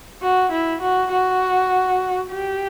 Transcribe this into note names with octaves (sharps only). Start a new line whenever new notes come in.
F#4
E4
F#4
F#4
G4